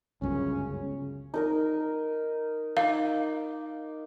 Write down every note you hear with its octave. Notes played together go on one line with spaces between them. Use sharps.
G1 C#2 F#2 C#3 C#4
D#4 A#4 D#5
D#4 F5 D6